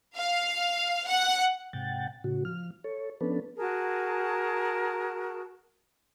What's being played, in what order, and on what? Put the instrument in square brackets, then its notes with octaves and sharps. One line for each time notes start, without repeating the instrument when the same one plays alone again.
[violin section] F5
F#5
[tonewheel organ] G#2 C3 F#5 G5 A6
A2 C#3 F#4
F3 F6
A4 C#5
F3 B3 C#4 D4 A4 B4
[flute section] F#4 G#4 A#4 A5